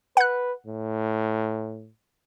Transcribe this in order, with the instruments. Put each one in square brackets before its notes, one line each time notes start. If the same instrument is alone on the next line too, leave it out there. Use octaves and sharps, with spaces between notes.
[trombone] B4 [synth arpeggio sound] F#5 F#6
[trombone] A2